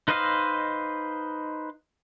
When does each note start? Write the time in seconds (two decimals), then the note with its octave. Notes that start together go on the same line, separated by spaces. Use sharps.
0.08 D#4 B4 C5 D#5 F5